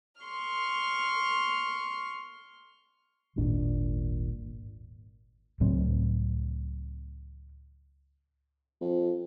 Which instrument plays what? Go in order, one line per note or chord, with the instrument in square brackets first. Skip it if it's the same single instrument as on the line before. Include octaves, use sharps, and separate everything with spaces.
[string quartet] C6 C#6 F6
[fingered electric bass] D#1 G#1 A#2 D4
C#2 A2 F#3 C4
[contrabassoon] F2